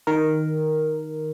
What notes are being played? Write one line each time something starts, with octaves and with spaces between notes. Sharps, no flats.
D#3 A#4